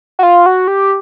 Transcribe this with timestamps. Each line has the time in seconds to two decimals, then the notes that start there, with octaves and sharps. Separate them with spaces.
0.19 F#4
0.23 F4
0.46 F#4
0.68 G4